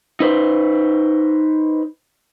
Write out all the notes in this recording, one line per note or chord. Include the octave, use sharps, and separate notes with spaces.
D#4 B4 C5